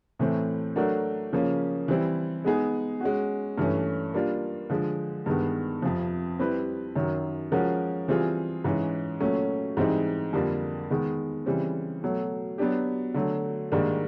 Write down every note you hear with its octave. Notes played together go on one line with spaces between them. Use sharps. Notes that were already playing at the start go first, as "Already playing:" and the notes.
A2 E3 A3 C4
F#3 A3 D4 F#4 A#4
C#3 F3 A#3 C#4
E3 G3 C4 E4
G#3 B3 D#4 G#4
G#3 C#4 F#4
G2 E3 A3 C#4
G3 A#3 D4 F4
D3 F3 G#3
G2 D#3 G#3 B3
F2 C3 F3
G3 C4 E4 G4 B4
F#2 D#3 F#3
F3 G#3 C#4 F#4 A#4
E3 G3 C4 F4 G#4
G#2 E3 G#3 C#4
A#2 F#3 A3 C#4
G#2 E3 G3 C4 D#4
F2 D3 G3 A#3 D4
D#3 G#3 B3
C#3 E3 G3 C4
B2 F#3 A3
F#3 B3 D4 G4
D3 F#3 A3
G#2 D#3 G3 A#3 D4